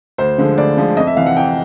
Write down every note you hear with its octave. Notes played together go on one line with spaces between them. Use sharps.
D2 C5
D3 F3 G#3
D2 D5
D3 F3 G#3
F2 D#5
E5
C3 E3 F5
F#5
F2 G5